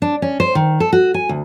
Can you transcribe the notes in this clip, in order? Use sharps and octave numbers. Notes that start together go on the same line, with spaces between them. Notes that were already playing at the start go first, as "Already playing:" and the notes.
D4
C#4
C5
D#3
A4
F#4
G#5
D2